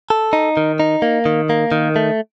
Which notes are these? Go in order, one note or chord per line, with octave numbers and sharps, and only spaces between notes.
A4
D#4
D#3
D#4
A#3
D#3
A#3
D#3
A3